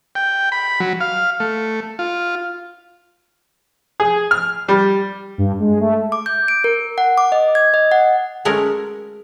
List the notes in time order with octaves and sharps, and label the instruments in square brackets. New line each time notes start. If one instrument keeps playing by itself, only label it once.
[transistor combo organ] G5
B5
F#3
F5
A3
F4
[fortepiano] G#4
F6
G3
[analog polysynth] G2
G#3
A3
[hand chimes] D6
G6
D7
A#4
F#5
D6
D#5
G#6
D#5
F#5
[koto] F#3 G#3 A3 C#4 A#4